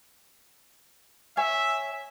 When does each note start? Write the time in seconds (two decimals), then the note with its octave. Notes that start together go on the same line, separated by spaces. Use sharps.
1.37 C#5 E5 G#5